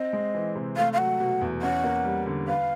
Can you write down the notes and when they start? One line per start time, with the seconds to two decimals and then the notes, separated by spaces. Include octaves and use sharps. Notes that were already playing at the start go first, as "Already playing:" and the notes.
Already playing: C4 D#5
0.13 G#3
0.35 E3
0.55 C3
0.77 A3 F5
0.93 F5
0.98 F#3 F#5
1.20 B2
1.41 E2
1.62 C#4 F#5
1.84 A#3
2.04 G3
2.26 D3
2.48 B4 F5